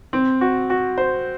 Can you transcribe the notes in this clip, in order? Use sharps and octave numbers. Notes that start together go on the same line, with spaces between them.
C4
F#4
F#4
C5